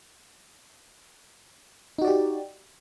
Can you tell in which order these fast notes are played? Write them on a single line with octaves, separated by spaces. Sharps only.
D#4 F#4 D5 G4